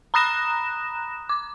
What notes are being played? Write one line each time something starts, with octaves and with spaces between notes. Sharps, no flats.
A#5 B5 D#6 F#6 A#6 E7
D6